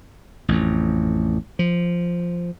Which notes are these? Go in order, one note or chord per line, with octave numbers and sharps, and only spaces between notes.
A1 F2
F3